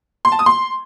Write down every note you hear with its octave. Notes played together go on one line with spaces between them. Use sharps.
C6
A5
D#6
C6